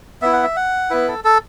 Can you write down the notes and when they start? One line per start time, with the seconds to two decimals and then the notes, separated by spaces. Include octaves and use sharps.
0.22 B3 E4 E5
0.33 F#5
0.43 E5
0.56 F#5
0.90 B3 E4 B4
1.08 A4
1.24 A4